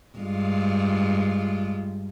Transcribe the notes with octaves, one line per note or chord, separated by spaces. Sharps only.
G2 G#3 F4